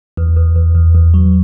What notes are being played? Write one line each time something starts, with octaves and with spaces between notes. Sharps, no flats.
E2
E2
E2
E2
E2
F#3